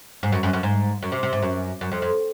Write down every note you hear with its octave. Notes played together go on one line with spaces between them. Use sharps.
G#2
F#2
F#2
F#2
G#2
F#2
C3
C3
G#2
F#2
F#2
F2
F2